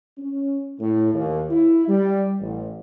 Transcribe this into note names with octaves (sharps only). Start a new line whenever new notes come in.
C#4
A2
D#2
E4
G3
A1